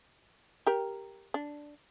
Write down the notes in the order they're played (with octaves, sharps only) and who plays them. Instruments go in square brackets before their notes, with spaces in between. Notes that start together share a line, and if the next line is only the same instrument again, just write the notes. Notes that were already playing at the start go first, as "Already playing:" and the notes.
[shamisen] G4 A#4
D4